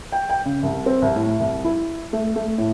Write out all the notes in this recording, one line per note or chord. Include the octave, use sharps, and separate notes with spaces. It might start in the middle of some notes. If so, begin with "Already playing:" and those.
G5
G5
C#3
C2
C4
C2
A2
C2
E4
A3
A3
A2